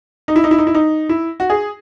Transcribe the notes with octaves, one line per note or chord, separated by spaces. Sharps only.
D#4
E4
D#4
E4
D#4
E4
D#4
E4
F#4
G#4